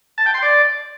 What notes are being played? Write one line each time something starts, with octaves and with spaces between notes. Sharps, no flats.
A5
G5
C6
D5